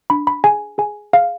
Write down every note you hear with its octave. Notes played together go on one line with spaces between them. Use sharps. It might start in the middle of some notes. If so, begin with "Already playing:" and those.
D4 B5
B5
G#4 G#5
G#4 G#5
G#4 F5